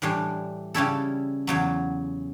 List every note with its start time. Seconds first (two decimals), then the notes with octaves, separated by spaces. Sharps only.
0.02 A2 E3 G3 D4
0.74 C#3 G3 C#4 E4 A4
1.47 E2 C#3 F#3